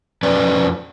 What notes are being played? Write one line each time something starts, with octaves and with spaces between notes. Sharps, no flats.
F2 C#4 B4 D5